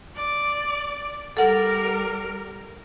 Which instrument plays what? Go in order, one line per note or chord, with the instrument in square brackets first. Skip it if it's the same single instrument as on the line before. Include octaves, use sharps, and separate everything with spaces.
[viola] D5
[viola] G3 A#4 [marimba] A4 F#5